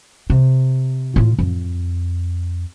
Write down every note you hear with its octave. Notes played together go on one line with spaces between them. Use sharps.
C3
A2 F4
F2